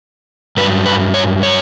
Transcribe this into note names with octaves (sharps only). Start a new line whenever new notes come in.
G2 F#3 B4
B4
C#5
C#5